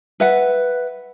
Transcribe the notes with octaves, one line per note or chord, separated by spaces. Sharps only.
B4 E5 F#5